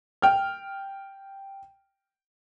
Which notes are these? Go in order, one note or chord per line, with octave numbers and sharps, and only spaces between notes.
G5 F6